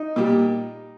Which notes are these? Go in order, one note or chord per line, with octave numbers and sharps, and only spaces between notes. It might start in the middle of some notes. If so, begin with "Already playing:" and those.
Already playing: D#4
A#2 G3